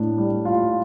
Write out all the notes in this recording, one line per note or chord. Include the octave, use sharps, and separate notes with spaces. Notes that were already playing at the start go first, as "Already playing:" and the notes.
Already playing: A2 D4
G3
F4